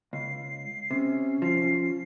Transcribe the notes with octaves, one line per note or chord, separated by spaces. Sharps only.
C#2 C7
C3 C#4
F3 C7